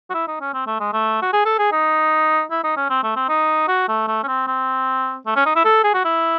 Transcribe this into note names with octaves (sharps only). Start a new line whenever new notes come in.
F#4
E4
D#4
C#4
C4
A3
G#3
A3
F#4
G#4
A4
G#4
D#4
E4
D#4
C#4
C4
A3
C4
D#4
F#4
A3
A3
C#4
C4
C4
A3
C#4
D#4
E4
A4
G#4
F#4
E4